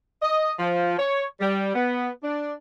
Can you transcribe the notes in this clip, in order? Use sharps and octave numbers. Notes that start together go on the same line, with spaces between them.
D#5
F3
C#5
G3
B3
D4